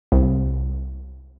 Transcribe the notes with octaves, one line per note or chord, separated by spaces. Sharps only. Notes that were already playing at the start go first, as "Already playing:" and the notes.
C2